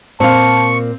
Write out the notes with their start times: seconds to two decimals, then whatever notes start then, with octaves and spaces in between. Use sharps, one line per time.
0.20 A#2 C4 F4 A5 C#6